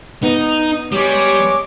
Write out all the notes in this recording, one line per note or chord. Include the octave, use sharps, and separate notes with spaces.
B3 D#4
G3 G#3 C#5 D6